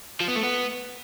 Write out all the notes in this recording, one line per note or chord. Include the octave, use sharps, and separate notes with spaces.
F3
B3
A3
B3